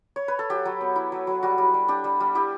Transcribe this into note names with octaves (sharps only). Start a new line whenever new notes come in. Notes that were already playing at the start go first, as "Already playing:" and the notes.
C#5
B4
A4
F#3 G4
F#3
B3
E4
F#3
F#3
G3 F#4
G3
G3
D4 G4
G3
G3
E4 G4